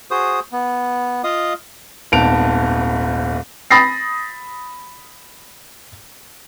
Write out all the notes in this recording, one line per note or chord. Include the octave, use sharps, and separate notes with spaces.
F#4 G#4 C5 D#6
B3
F4 D#5 F5 D#6
D#1 G#1 B3 A5 D7 F7
B5 D#6 A6 A#6 C7